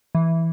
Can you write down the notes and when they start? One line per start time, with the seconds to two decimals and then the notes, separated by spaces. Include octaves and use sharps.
0.15 E3